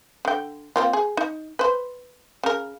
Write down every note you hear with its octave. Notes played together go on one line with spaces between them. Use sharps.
D3 G5
A#3 C4 F4
G#4
D#4
B4 C5
C#3 A#4